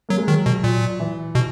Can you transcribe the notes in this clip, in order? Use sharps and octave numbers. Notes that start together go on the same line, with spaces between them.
F#3 A#3
G#3
D#3 F#3
B2
A#2
E3
B2